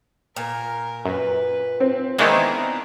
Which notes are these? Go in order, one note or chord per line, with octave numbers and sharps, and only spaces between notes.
A#2 A#4
F#2 B4
C4
D#3 E3 G#3 A#3 B3 D4 E4